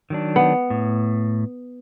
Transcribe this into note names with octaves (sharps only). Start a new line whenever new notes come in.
D#3 F#3 D4
B3
A2